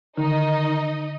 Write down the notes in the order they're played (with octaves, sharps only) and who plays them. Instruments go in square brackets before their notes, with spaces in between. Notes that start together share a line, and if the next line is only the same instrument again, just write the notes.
[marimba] D3 [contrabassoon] D#3 [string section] D#4 D#5